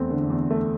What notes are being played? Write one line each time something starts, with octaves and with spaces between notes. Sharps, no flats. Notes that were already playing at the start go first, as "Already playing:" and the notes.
Already playing: E2 A3 C4
D3
E2
A3